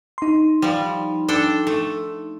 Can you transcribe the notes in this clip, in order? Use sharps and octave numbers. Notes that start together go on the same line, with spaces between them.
D#4 C6
F3 G3
D4 A4 G5
A3